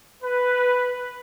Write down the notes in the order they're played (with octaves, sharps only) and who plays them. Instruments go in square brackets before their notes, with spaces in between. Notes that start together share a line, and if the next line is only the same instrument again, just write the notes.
[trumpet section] B4